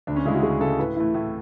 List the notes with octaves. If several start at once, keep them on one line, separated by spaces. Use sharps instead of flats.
D2 D4
C#4
C#3 G#3 E4
F#4
D2 G#4
C#3 G#3 A4
A2 B4
E3 A3 E4
A2